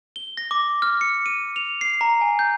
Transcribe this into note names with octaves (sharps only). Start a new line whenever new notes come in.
G7
A#6
D6
F6
C#7
D#7
F7
C7
A#5
G#5
G6